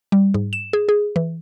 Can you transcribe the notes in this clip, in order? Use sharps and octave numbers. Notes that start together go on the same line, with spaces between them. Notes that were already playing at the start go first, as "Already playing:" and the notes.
G3
G#2
E7
G#4
G#4
E3